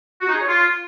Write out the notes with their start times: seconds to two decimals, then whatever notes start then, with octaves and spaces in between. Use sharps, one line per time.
0.21 F#4
0.28 D#4
0.35 G#4
0.42 C#5
0.48 F4